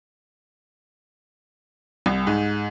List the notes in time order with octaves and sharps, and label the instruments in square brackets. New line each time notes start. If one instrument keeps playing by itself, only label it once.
[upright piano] C2
G#2